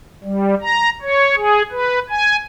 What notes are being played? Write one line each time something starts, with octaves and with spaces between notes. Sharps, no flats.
G3
A#5
C#5
G#4
B4
G#5